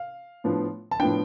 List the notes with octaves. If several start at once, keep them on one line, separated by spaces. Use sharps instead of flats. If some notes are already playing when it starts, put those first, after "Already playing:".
Already playing: F5
A2 F3 B3 D4
A5
A2 F3 B3 D4 G5